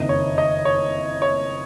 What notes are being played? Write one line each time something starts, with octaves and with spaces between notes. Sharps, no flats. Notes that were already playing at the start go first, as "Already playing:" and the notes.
Already playing: F#1 F2 D#3 D#5
C#5
D#5
C#5
C#5